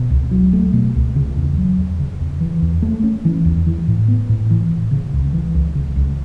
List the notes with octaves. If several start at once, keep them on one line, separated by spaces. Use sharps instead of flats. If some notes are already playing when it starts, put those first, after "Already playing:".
Already playing: B2
C#2
F#3
A3
B2
C#2
C#3
E2
F#3
E2
C#3
E2
E3
E2
A3
C#4
E3
E2
E3
A2
B3
A2
E3
A2
C#3
C#2
E3
C#2
C#3
C#2